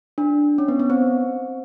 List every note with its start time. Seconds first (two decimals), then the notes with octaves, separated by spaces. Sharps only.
0.18 D4
0.58 C#4
0.68 B3
0.79 B3
0.90 C4